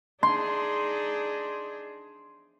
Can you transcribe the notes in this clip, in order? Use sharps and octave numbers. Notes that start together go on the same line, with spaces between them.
D4 D#4 G#4 C6